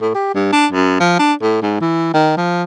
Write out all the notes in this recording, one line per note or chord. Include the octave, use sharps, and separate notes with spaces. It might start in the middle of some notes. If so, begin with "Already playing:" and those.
A2
G4
G2
D4
F#2
F3
D4
A2
G#2
E3
D#3
F3